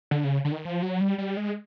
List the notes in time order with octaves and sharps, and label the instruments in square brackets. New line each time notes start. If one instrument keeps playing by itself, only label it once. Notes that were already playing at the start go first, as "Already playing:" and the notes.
[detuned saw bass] D3
C#3
D3
D#3
F3
F#3
G3
G3
G#3